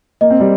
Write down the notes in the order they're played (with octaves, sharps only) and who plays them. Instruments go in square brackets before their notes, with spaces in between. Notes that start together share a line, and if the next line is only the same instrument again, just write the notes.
[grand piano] A#3 [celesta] D#5
[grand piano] C4
G3 A#3